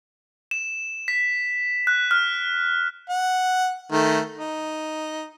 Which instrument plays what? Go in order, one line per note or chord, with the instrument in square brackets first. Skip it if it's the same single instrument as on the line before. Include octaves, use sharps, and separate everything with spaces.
[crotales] E7
B6
F#6
F6
[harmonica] F#5
D#3 A3
D#4